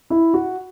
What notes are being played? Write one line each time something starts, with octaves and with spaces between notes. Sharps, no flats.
E4
F#4